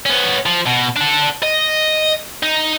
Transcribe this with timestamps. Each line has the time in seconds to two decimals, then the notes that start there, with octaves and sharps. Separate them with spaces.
0.06 B3 C#4
0.46 F3
0.66 B2
0.96 D4 A4
1.43 D#5
2.43 D#4